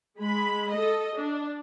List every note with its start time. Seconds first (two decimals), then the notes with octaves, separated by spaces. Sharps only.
0.19 G#3 B5
0.71 A4 D#5
1.17 D4